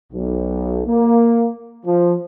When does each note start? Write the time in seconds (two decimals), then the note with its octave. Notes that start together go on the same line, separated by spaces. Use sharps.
0.13 B1
0.87 A#3
1.86 F3